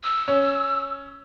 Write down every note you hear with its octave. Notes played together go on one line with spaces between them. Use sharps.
E6
C#4